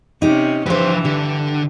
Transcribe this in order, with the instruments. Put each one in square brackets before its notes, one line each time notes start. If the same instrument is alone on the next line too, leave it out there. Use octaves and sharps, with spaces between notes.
[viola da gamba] C3 C#4 [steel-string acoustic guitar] D#4 G4
[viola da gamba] G2 E3 [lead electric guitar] F3 B4 [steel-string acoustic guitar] G4 C5
[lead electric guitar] D3 [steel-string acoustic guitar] G4